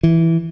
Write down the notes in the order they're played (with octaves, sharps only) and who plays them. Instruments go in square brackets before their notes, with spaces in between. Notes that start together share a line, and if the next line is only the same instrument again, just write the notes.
[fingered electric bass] E3